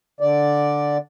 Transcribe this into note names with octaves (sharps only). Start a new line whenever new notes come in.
D3 D5